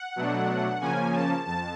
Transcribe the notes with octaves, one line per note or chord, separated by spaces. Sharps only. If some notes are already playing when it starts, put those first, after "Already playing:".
Already playing: F#5
B2 F#3 A3 D4
C#3 F3 A#3 C#4 G#5
A5
F2 A5